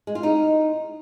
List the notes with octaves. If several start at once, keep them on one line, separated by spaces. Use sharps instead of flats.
G#3
F4
D#4